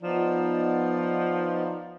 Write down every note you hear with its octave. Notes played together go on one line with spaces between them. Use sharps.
F3 B3 D#4 D5